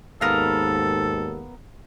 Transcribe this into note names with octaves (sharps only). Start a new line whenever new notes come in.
D#2 G#2 B3 A4 A#4 F5